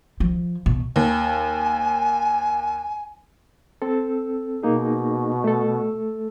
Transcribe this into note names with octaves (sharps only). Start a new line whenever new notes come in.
F3
B2
D#2 G#5
C4 A4
B2 A#3 D#4 G#4
A3 A4